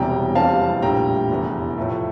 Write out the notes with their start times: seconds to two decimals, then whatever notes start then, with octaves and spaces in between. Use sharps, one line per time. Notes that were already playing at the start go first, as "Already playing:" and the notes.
Already playing: E1 E2 C3 E3 G3 G5 A#5
0.35 F1 E2 E3 G3 C4 F5 A5
0.82 A#1 A2 G3 G5 A#5
1.29 F1 E2 E3
1.78 A2 F3 A3